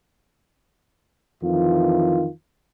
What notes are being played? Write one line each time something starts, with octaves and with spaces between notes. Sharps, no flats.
F2 D#3 E3 F4